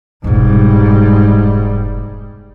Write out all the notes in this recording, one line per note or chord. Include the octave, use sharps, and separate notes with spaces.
F1 G#2 B2 G3